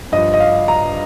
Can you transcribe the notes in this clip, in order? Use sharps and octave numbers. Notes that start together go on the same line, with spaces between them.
G2 F3 D#5
D#5
F5
A#5